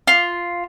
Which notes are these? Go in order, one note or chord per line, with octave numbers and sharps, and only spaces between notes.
F4